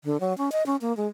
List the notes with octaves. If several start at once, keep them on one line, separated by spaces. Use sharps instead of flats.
D3
F#3
C#4
D#5
C#4
A#3
G#3